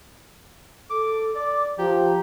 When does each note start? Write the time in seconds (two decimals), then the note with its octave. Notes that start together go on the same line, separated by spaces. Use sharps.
0.90 A4 D6
1.35 D5 D6
1.79 F3 G4 A#5